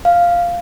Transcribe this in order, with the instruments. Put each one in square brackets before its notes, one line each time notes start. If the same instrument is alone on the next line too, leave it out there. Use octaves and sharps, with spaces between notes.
[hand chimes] F5